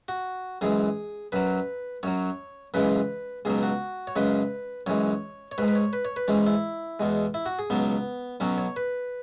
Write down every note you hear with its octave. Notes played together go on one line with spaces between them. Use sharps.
F#4
F#2 E3 G#3 G#4
F#2 F#3 B4
F#2 F#3 C#5
F#2 C#3 E3 G#3 B4
C#2 B2 F#3 G#4
F#4
C#5
F#2 C#3 G#3 B4
F#2 E3 G#3 C#5
C#5
G#2 G#3 B4
B4
C#5
B4
C#5
B4
G#2 E3 G#3 C#4
E4
E2 B2 G#3
E4
F#4
G#4
C#2 B2 F#3 B3
B1 B2 F#3 C#4
C#5
B4